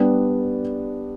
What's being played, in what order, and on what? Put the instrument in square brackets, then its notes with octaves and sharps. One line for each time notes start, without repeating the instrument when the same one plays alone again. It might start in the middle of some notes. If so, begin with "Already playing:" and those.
Already playing: [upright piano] G3 B3 D4